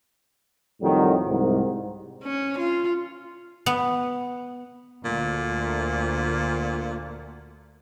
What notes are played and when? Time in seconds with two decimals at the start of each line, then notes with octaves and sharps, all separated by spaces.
0.81 F2 A2 D#3 F#3 G3
1.26 C2 G#2
2.23 C#4
2.58 F4
3.66 B3
5.05 D2 A#2